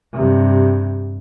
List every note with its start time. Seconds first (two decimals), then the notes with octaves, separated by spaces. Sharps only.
0.13 G2 C3